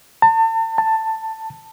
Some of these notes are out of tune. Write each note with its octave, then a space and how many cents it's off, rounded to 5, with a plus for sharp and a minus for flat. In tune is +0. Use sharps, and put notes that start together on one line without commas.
A5 +35
A5 +10